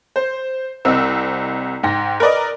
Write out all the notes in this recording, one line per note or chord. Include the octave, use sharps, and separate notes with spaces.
C5
C2 C4 D#5 E6
G#2 G5 A#6
A#4 B4 D5 D#5